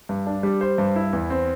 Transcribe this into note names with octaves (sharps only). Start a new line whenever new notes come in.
G2
D4
G3
C5
G2
E4
E2
C4